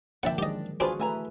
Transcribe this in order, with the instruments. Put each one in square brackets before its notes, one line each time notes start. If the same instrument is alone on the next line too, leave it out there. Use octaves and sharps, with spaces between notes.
[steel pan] D3 F3 A#3 [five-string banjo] D4 D5 G5 [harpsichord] E5 F#5
[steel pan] D#3 F#3 G#3 [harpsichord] G4 D#5
[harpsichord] C4 D4 [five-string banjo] F4 B4 G#5 [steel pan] F#4 G#4
[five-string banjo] E3 G#5 A#5 [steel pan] A3 B4